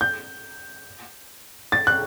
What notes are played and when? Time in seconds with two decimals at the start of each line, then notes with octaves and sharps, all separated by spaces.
0.01 G6
1.72 A6
1.87 F#6